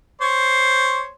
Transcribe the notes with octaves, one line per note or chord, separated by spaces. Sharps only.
C5 C#5